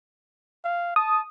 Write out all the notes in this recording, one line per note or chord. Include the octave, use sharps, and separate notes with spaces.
F5
A5 D#6